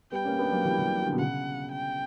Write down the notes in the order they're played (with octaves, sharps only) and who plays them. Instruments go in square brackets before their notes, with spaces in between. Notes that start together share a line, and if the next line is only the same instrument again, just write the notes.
[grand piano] G3 B3 [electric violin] G5
[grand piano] A#3 C#4
B3 D4
F#3 A#3
E3 G3
E3 G3
G3
D3 F#3
B2
[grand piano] C#3 [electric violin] F#5
[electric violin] G5